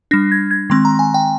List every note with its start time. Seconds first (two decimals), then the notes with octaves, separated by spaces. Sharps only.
0.11 G3 D4 A#6
0.32 G#6
0.51 G#6
0.70 D#3 G#3 C4 C6
0.85 A#5
0.99 G#5
1.14 G5